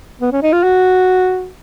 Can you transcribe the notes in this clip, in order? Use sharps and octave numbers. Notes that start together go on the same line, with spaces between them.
B3
C#4
D#4
F4
F#4